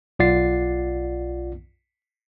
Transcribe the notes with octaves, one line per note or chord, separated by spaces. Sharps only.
B1 F4 D5 F#5 A6 C7